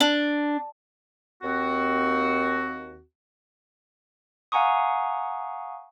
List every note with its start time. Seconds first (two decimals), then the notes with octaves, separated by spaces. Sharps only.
0.01 D4
1.42 D#2 C4 F#4
4.52 F5 F#5 G#5 A#5 C#6 D#6